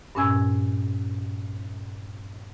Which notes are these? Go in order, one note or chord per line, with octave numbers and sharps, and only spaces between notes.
G2 A#2 C#4 G#5 E6 G#6